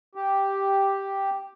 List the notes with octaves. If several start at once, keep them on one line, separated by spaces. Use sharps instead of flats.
G4